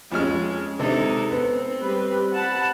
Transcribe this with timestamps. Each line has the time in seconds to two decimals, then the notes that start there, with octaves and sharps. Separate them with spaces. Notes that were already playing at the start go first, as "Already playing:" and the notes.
0.12 F2 G#3 C#4 F6
0.79 C3 G#3 D4 D#4 A4
1.31 B3 C4
1.80 G3 B4
2.36 F#5 A5 B5